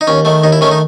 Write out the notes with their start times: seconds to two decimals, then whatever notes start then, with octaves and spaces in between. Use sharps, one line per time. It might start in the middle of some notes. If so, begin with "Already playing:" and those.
0.01 D#4
0.07 D#2 C#4
0.25 D#3 A3
0.44 D#2 D#4
0.52 E4
0.61 D#3 A3 C#4
0.71 D#4